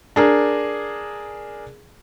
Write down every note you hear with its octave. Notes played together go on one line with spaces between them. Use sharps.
D4 G#4 A#4